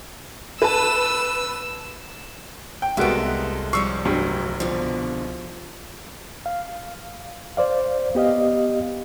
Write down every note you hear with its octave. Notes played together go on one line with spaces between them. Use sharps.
B4 A5 E6
G5
C2 G#3 A#3 B3 F#4 A4 E5 D7
F3 G3 C#4 C#6 E6 C7
F1 G2 F#3
B2 D3 F3
F5
C5 D5 F5
B3 G4 D#5 F5